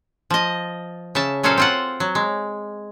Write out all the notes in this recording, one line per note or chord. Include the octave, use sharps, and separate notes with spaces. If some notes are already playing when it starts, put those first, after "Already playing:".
F3 D#5
C#3 E5 A5
A#2 F#3 C#4 A4 C5 F5
C4 F4 F#5
F#3
G#3